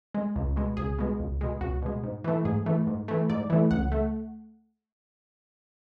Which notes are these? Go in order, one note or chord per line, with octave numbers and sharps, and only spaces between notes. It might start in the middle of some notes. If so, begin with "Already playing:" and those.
G#3
C#2
B2 G#3
C#2 G#4
B2 G#3
C#2
B2 G#3
C#2 F#4
B2 G#3
G#2
E3 A3
G#2 G#4
E3 A3
G#2
E3 A3
G#2 D5
E3 A3
C#2 F#5
A3